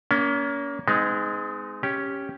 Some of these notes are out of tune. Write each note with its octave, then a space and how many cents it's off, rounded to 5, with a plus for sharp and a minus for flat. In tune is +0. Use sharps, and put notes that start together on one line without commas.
A#3 +15 C#4 +35
G#3 +0 C4 -45 D#4 +0
C#4 +0 G4 +0